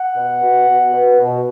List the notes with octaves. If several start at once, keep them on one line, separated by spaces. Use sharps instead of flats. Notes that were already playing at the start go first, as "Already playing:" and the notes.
Already playing: F#5
B2
B2
B2
B2
B2